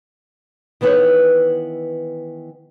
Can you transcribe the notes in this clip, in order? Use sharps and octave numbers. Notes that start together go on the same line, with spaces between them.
D#3 E3 B3 E4 C5 C#5